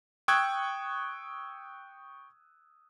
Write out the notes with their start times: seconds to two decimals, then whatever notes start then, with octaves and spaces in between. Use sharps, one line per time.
0.28 G5 C#6 D#6 E6 F#6 G#6